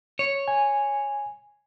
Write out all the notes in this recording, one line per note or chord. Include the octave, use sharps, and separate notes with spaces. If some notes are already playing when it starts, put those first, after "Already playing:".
C#5
G#5